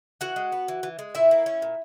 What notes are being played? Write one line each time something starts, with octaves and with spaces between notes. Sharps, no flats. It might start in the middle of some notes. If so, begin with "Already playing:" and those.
E3 F#4 F#5
G#3
B3
E3
E3
G#3
A#2 E4 E5
A#3
C#4
A#2